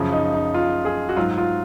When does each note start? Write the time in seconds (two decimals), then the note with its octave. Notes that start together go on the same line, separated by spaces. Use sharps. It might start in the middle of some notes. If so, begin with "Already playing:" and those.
Already playing: F#2 C#3 F3
0.13 D#4
0.34 D#4
0.54 F4
0.85 G#4
1.09 F#4
1.16 G#2 F#3 F4
1.38 F4